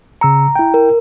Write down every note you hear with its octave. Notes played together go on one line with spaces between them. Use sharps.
C#3 A#5 E6 C#7
E4 G5
A#4